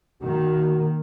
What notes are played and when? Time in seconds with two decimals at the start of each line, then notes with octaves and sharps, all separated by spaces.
0.22 D#3 A#3 F#4